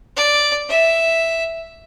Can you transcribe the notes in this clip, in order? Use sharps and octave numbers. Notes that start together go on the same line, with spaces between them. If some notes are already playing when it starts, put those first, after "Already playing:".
D5
E5